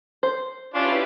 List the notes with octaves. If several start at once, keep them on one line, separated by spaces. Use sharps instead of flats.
C5
C#4 D4 E4 F4 G4 B4